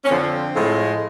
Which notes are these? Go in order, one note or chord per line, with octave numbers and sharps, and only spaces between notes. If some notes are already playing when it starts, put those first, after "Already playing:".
C#4
F2 D3 F3 C4
A2 F3 G#3